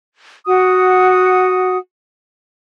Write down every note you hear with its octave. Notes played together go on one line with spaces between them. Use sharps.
F#4 F#5 D#6